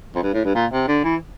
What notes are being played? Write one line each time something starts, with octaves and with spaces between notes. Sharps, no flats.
F2
G2
A2
G2
A#2
C3
D3
E3